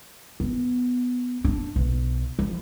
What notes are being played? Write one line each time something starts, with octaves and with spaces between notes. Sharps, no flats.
B3
D4
B1
F3